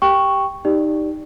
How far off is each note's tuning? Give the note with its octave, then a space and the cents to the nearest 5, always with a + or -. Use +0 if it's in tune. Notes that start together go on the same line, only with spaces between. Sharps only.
G4 +0 G5 +0 C#6 +0
D#4 +0 G4 +0 D5 +10